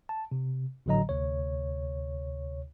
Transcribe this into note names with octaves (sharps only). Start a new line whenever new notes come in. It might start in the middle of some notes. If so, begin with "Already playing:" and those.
A5
C3
G#1 A2 D3 F#3 D#5 A#5
D2 C3 C#5